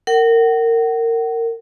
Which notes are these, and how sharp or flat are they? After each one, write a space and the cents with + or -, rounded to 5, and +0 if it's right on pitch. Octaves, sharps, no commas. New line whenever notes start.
A#4 -25 F#5 +35